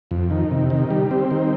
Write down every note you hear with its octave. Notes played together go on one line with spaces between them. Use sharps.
F2
D#3
C3
D#3
G3
C4
D#3